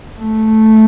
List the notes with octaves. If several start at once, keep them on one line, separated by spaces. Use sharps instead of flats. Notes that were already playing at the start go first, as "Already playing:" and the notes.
A3